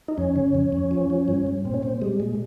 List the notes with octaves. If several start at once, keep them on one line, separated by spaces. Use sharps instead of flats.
D#4
F2 C#4
C#3
F2
F2
F3
F3
G2
G2
A#2 C4
C#4
A#2 C4
G3 G#3
A#2